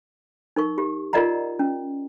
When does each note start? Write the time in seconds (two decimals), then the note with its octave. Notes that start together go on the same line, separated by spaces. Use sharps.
0.56 D#4 A#4 C#6
0.78 G4
1.13 F4 A#4 D5 D#5 F#5 A#5
1.59 C#4